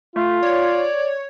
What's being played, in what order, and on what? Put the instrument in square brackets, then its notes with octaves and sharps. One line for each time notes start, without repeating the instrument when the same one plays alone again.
[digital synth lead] A3 [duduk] F4
[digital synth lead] C#5 [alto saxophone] D5